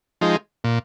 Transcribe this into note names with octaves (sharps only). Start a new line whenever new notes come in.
F3 G#3 D#4
A#2